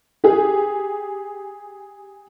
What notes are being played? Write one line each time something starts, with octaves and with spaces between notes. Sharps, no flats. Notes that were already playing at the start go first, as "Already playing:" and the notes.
G4 G#4